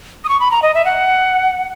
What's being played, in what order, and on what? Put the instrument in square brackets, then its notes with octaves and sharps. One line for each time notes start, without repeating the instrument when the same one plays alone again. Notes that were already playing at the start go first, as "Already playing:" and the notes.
[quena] D#6
C#6
B5
A#5
D#5
E5
F#5